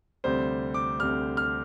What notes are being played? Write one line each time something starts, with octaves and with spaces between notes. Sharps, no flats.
D2 C3 G3 C5
D6
D2 C3 G3 F6
F6